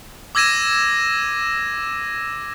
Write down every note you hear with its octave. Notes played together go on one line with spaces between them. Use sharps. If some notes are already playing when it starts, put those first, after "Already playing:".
D6 E6 G#6 A#6 D#7 E7